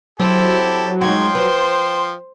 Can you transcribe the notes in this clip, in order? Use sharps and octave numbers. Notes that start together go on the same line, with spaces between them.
F#3 C4 E4 G4 A4
F3 G#3 D#4 F#4 G5 C6 G#6
B4 C5